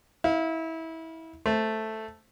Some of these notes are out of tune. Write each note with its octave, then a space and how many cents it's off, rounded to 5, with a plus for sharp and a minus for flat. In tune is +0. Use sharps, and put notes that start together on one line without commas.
E4 -25 F5 +0
A3 +0 C5 +0